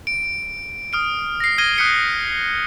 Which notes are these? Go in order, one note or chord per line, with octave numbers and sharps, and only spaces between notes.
D7
D#6 F6 D7
A#6 C7
D#6 F6 G#6 A#6 D#7 G7
D#6 F#6 G6 B6 C#7